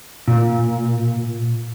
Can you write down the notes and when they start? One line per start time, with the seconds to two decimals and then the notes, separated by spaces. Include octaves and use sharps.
0.28 A#2